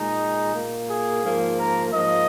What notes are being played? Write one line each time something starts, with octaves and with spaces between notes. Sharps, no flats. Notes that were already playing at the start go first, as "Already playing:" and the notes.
Already playing: A#2 G#3 D#4
A#2 A#3
G#4
G#2 F3 A#3
A#4
G#2 F3 A#3 D#5